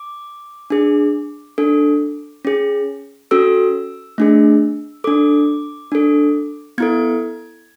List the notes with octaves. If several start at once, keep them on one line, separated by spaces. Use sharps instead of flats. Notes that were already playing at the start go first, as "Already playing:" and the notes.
Already playing: D6
D4 G#4
D4 A4
C#4 G#4
C#4 F#4 A4 E6
A3 D4 G#4
D4 A4 D6
D4 A4
B3 E4 A4 G#6